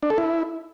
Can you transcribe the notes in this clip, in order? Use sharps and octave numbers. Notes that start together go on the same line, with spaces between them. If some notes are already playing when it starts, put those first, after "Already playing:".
D4
A4
E4